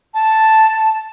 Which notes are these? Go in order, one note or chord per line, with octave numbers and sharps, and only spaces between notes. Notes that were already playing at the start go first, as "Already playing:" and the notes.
A5